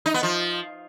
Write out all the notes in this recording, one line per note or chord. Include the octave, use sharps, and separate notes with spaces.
D#4
B3
F3